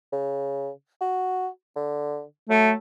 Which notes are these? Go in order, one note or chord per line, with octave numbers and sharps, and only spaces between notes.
C#3
F#4
D3
F#3 A3